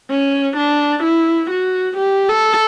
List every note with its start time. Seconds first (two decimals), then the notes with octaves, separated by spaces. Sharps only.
0.10 C#4
0.57 D4
1.04 E4
1.50 F#4
1.98 G4
2.29 A4